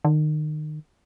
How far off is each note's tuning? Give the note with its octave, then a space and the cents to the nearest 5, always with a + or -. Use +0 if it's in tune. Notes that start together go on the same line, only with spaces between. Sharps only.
D#3 -30